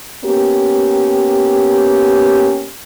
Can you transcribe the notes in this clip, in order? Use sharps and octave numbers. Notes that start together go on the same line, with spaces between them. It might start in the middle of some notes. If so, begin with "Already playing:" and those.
A#3 B3 C#4 G4